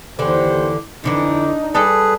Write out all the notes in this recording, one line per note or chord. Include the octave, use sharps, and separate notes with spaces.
D#2 D3 E3 G4 C5
F2 D3 E3 D4 D#4
G3 G#4 A4 B4